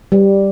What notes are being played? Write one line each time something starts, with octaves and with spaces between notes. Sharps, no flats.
G3